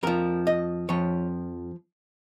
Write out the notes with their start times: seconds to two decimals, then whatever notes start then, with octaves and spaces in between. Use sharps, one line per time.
0.03 F2 F3 A#4
0.47 D#5
0.89 F2 F3 C#5